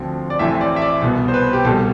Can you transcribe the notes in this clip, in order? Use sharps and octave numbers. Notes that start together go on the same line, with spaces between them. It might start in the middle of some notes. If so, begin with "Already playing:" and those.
Already playing: D2 D3 F3 C4
D5
A1 A2 E3 A3 C4 E5
D5
E5
D5
C2 B2 B3
C5
B4
G4
C2 B2 G3 A4